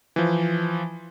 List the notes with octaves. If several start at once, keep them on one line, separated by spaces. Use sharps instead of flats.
E3 F3